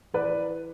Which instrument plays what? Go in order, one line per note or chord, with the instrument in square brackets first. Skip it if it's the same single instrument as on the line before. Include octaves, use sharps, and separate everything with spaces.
[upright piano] E3 B4 D5